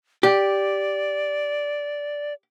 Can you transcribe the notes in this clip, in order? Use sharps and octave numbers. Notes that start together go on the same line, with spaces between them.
G4 D5